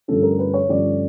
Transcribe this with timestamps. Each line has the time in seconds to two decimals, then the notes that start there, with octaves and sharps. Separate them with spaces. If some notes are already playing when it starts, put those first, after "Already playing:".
0.08 G2 D3 F3 A3 C#4 A4
0.23 A#4
0.39 B4
0.54 C#5
0.69 G2 D3 F3 A3 C#4 D5